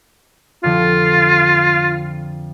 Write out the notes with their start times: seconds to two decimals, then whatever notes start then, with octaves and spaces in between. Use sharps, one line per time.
0.64 F2 D3 F3 F4